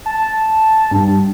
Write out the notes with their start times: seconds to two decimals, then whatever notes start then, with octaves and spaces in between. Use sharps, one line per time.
0.06 A5
0.91 G2